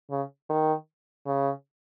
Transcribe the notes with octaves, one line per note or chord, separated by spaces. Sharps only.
C#3
D#3
C#3